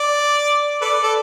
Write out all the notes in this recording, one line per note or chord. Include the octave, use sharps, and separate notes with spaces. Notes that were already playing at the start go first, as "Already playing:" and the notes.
Already playing: D5
A4 B4 D5
A4